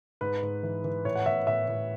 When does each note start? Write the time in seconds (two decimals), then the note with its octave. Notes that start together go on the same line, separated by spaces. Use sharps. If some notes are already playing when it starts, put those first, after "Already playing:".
0.21 G#2 B4
0.42 G#2
0.63 E3
0.84 E3
1.05 A2 C#5
1.15 F#5
1.26 A2 E5
1.47 A2 E5
1.68 A2